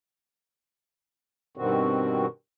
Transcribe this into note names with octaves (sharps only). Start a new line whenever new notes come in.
G2 B2 D#3 C4 F#4